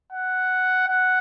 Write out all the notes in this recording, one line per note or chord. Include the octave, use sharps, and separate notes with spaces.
F#5
F#5